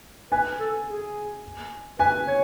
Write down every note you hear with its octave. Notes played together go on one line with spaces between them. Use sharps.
B4 G#5
A4
G#4
B4 G#5
C#5